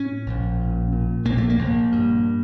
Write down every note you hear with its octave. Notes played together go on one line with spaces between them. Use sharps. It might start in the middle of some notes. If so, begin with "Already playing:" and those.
Already playing: A2 C#4
A#1
A#2
A#2
A#1 A#3
A3
A#3
A#1
G2